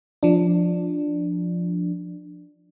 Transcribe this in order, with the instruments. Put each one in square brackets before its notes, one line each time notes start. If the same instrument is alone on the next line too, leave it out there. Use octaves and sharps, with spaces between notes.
[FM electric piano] F3 D4